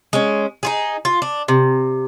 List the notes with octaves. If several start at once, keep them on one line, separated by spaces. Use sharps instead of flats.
G#3 C#4
D#4 F4 G#4
F4
D4
C3